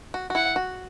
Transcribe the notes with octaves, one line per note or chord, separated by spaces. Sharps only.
F#4
F#4
E4 F#5
F#4